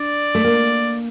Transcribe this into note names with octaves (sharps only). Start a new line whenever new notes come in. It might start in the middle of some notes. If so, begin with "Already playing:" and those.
Already playing: D4 D5
A3
A#3